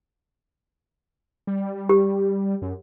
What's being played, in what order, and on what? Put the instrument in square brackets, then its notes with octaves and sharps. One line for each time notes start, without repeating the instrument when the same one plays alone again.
[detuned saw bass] G3
[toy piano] G4
[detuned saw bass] F#2